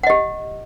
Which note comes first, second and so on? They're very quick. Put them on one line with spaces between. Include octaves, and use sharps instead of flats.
F#5 D#5 G4